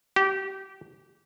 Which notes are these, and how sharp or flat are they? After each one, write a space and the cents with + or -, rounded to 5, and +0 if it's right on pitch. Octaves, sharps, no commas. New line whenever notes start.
G4 -25